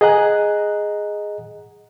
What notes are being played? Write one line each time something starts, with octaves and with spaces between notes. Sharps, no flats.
G#4 D#5 F#5 A#5 F#6